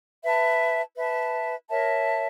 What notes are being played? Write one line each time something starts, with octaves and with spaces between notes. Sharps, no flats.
B4 E5 A5
B4 E5 A5
A#4 C#5 E5 A5